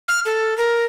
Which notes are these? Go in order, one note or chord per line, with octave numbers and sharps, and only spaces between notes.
F6
A4
A#4